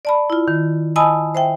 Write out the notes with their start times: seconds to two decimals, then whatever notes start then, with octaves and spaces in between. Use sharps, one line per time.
0.05 D5 A5 B5
0.30 E4 F4
0.48 D#3
0.96 D#5 G#5 A5 B5 D#6 E6
1.35 C5 E5 G5